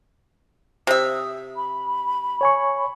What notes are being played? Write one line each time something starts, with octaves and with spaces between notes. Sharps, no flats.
C3 E5 D#6
B5
C#5 G#5 C#6